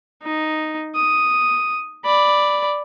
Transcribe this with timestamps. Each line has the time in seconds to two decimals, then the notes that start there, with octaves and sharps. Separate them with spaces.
0.23 D#4
0.95 D#6
2.05 D5 B5